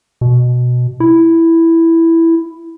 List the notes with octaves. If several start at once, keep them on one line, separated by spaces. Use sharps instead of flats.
B2
E4